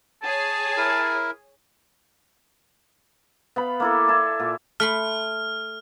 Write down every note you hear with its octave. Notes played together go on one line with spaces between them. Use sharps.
G#4 C#5 G#5 A5
E4 A#4
B3 F5 B5
A#3 E4 A4
E4 D5 A5
A#2
A3 B5 C6 F6